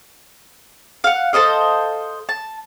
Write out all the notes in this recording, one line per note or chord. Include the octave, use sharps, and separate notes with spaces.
F5 F#5
A4 C5 D#5 F5
A5